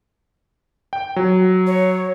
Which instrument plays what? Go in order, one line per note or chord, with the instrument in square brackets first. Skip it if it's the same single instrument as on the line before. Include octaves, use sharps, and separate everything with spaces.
[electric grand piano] G5
F#3
[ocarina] C#5